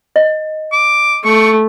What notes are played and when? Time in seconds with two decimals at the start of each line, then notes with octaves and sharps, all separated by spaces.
0.16 D#5
0.72 D6
1.25 A3 C#6